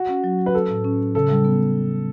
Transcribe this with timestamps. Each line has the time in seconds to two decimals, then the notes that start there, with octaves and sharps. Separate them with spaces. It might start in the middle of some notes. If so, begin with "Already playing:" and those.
Already playing: F#4
0.09 C#4
0.24 F#3
0.39 F#3
0.46 B4
0.54 F#3 A4
0.69 A2
0.84 C#4
0.99 F#3
1.15 C#3 A4
1.30 G3
1.45 B3